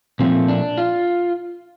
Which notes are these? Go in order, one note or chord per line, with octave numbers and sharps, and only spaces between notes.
A#2 F3 A3 C4
D4
F4